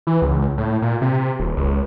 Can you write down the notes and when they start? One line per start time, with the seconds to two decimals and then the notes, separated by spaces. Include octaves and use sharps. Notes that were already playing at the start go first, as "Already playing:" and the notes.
0.07 E3
0.22 C#2
0.58 A2
0.82 A#2
1.01 C3
1.40 D#1
1.57 C#2